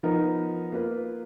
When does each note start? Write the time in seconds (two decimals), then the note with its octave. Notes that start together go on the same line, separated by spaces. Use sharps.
0.03 F3 B3 D#4 A#4
0.72 A#3 F4 B4